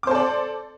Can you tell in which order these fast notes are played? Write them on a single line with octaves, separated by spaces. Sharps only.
D6 C5 A4 D5